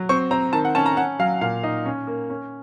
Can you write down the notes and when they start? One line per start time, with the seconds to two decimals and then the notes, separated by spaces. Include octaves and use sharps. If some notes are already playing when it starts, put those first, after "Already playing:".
Already playing: F#3
0.09 C4 C#6
0.31 C4 A#5
0.53 D#3 A5
0.65 F#5
0.75 C#4 A5
0.86 A#5
0.97 C#4 F#5
1.19 F#3 F5
1.41 A#2 F5
1.63 D#4
1.86 C#4
2.07 A#3
2.30 C#4